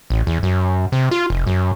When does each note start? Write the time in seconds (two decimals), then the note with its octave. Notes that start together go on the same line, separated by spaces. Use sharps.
0.10 A1
0.27 E2
0.43 F#2
0.92 C3
1.11 F4
1.30 F1
1.47 F#2